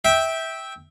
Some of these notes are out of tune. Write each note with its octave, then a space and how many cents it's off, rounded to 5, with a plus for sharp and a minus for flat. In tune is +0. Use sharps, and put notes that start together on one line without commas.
E5 -15 G5 +0